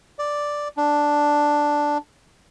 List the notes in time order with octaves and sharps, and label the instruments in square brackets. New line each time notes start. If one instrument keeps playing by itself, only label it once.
[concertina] D5
D4